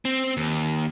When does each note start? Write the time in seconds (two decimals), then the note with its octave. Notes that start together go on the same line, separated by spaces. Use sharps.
0.05 C4
0.37 D#2